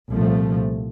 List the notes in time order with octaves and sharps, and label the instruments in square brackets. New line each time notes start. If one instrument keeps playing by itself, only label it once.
[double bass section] C2 A#2 F3 A3